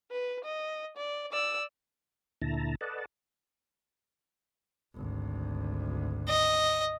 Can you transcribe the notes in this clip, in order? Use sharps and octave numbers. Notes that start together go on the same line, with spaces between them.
B4
D#5
D5
D5 E6
D2 A#2 D3 E4 A5 A#5
A4 B4 D5 D#5 F#5 A5
G#1 D2
D#5